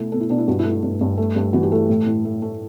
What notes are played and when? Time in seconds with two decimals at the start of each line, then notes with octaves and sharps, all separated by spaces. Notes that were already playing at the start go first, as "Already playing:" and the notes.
Already playing: B2 A3 E4
0.12 B2 A4
0.20 E4
0.30 B2 D4
0.38 E4
0.48 G2 F#4
0.59 E4
0.65 A3
0.71 E4
0.83 G2
1.01 G2
1.18 A3
1.36 G2
1.53 E3 F#4
1.63 G4
1.72 A3 A4
1.89 A2
2.06 A2
2.25 A3
2.42 A3